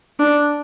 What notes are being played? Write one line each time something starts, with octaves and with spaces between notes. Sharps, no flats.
D4